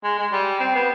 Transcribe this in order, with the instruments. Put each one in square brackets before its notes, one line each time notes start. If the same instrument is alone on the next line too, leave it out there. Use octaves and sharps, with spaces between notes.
[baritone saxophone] G#3
G#3
G3
C4
B3